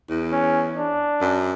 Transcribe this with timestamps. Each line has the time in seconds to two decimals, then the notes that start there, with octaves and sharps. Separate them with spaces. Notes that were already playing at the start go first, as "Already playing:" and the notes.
0.10 E2
0.32 C#4
0.76 D4
1.21 F#2